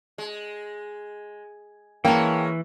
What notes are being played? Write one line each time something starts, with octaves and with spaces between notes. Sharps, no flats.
G#3
E3 G#3 A#3 C#4 G5 A5